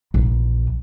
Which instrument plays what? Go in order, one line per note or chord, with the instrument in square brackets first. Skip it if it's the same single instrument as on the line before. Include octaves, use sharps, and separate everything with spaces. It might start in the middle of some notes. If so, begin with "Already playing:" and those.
[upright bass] A#1 E2